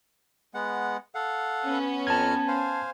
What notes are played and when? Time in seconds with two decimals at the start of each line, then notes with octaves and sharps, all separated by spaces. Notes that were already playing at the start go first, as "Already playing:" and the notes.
0.54 G#3 B3 F#5
1.15 A4 F5 F#5
1.64 B3 C#4
2.07 F2 A5 A#5 F6 G#6
2.48 C5 F5 G#5